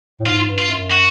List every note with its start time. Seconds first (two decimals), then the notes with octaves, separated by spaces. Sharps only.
0.20 A2
0.25 G#2 F4
0.47 G2
0.58 F4
0.69 F#2
0.91 F#4